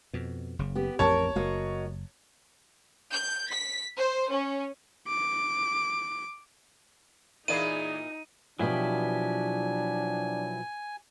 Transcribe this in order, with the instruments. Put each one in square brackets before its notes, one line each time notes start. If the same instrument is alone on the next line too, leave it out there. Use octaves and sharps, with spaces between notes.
[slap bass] F2 B2
F#1 C#3
[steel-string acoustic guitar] B3 G4
[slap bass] A1 F2 C4 [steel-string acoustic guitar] A#4 [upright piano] C#5 A5
[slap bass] F#1 [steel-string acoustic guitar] A#3 F#4 D#5
[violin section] G6
B6
C5
C#4
[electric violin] D6
[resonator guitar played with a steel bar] A#2 A#3 E4 [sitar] E3 G#4 D5 [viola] D#4 [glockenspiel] D#7
[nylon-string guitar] B2 F3 [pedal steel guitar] F#3 E4 G4 [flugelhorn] D4 [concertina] G#5